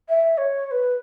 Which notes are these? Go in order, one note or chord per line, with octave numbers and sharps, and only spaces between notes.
E5
C#5
C#5
B4